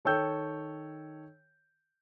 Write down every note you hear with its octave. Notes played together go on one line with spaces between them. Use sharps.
D#3 A4 C#5 G5 E6 G6